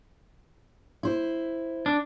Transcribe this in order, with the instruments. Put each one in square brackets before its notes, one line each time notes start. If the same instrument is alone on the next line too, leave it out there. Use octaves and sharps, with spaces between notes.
[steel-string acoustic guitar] E4 C5
[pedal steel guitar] D4